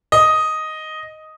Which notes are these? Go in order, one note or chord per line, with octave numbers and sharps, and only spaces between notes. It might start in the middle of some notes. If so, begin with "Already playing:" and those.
D#5